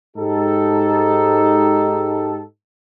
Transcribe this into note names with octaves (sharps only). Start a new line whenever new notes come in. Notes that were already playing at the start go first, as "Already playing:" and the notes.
G#2 D#4 G4 A4